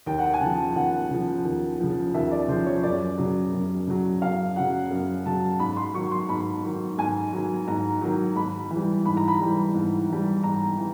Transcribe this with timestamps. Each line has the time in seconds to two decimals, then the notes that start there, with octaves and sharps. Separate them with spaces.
0.06 D#2 G5
0.19 F#5
0.26 G5
0.34 G#5
0.41 C#3 F3 A5
0.75 D#2 F#5
1.11 C#3 F3
1.44 D#2
1.80 C#3 F3
2.14 D#2 E5
2.31 D5
2.48 C#3 F3 C5
2.66 C#5
2.83 F#2 D5
3.18 C#3 F#3
3.52 F#2
3.87 C#3 F#3
4.22 F#2 F5
4.56 C#3 F#3 F#5
4.90 F#2
5.26 C#3 F#3 A5
5.59 G#2 B5
5.77 C6
5.94 D#3 F#3 C#6
6.11 C6
6.29 G#2 B5
6.63 D#3 F#3
6.98 G#2 G#5
7.33 D#3 F#3
7.67 G#2 A#5
8.02 D#3 F#3
8.36 G#2 B5
8.71 E3
8.76 G3
9.05 G#2 B5
9.17 A#5
9.28 B5
9.41 E3 G3
9.74 G#2
10.10 E3 G3
10.44 G#2 A#5
10.78 E3